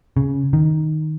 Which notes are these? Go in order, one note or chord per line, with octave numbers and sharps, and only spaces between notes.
C#3
D#3